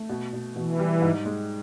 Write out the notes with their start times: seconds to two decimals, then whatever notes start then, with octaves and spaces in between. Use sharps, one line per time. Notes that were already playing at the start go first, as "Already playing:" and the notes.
Already playing: A3
0.09 B2
0.33 B2
0.55 B2 E3
0.79 G3
1.02 G#2
1.25 G#3